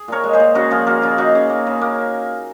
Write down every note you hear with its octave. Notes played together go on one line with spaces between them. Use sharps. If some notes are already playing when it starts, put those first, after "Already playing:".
Already playing: G#4
A#2 A#4 C#5
G#3
G#4 C5
A#2
C#3 F#4 A#4
F3 F4 G#4
A#3 F#4 A#4
C#3 F4 G#4
C#3 D#4 F#4
C#3
A#3
C#3
A#3